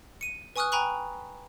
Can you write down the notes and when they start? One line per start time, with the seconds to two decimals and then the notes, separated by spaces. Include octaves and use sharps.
0.21 C#7 D#7
0.56 B4 G#5 C#6 D#6 F6 F#6
0.72 G5 G#5 A#5 B5 C#6 F#6